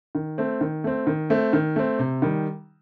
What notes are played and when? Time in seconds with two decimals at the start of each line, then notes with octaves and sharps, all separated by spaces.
0.15 D#3
0.38 A3 C4
0.61 D#3
0.84 A3 C4
1.07 D#3
1.30 A3 C4
1.53 D#3
1.76 A3 C4
1.99 C3
2.22 D#3 G3